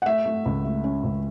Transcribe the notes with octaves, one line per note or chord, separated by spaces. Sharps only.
F#5
A3 E5
A3
C#2
A3
C#4
C#2